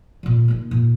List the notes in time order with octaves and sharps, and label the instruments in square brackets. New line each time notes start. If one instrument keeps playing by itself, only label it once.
[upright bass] A#2 D3
A#3 D#4
A#2